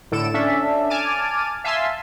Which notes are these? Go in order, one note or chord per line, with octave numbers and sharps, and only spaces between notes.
A2 D3 A4 D7 E7
C#4 D4 A4 E5
G#5 A5 D6 F6 D#7
E5 F5 G#5 A5 C6 E6